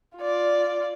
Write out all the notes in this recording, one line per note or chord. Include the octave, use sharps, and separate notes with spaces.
F4 D5